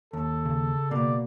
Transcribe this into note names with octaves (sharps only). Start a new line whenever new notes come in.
D#2 A4
C#3
B2 A#3 D5